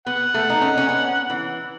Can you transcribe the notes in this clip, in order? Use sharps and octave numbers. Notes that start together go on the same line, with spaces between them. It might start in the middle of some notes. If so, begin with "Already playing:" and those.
B3 F#5
A3
D#4
C#4
C#4
B3
E3